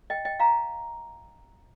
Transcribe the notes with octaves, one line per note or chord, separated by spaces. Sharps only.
D#5 G5
D#5 G5
F5 A#5